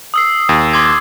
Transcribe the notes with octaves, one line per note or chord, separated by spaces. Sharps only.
D#6 E6 C7
D#2
C6 D6 G#6